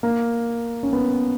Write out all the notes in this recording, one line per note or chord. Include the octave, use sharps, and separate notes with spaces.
A#3
C#4
B3